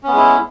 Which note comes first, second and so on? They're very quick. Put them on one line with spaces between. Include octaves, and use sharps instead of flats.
C#4 B3 G#3 E4